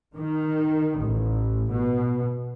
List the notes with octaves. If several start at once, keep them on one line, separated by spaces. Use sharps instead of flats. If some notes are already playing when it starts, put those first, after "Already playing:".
D#3
A1
B2